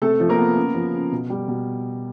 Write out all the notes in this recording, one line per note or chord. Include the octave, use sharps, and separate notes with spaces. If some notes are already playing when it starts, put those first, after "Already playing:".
C3 A3 A4
F3
A#3 A#4
B3
C#3
F3
C#3
B2
G3
B2